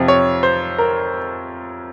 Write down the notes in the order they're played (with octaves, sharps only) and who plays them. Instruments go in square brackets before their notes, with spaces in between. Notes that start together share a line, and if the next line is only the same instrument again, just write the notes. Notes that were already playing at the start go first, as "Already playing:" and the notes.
Already playing: [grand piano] F2 C3 F3
C#5
C5
A#4